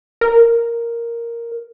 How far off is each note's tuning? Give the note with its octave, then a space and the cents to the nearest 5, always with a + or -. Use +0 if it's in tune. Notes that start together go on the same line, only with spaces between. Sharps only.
A#4 +0